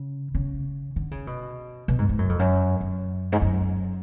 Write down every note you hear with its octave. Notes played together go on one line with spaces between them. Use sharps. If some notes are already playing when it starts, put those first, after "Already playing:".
Already playing: C#3
C#3
D3
C#3
B2
B2
G#2
G#2
F#2
F2
F#2
F#2
G#2
F#2